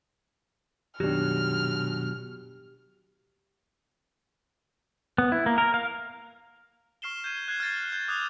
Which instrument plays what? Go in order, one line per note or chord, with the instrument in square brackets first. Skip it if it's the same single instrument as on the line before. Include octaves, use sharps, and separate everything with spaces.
[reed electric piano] F#2 D#3 D4 [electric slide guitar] B2 F#3 [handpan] G4 [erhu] F6
[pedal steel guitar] B3
E4
A#3
A#4
F5
[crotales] C#6 F6 C7 E7 G7
G6 G#6 D#7
F#6 G#6 C7 G7
F6 G6 A6 C7
G6 G#6
D6 D#6 F#6 G#6 F7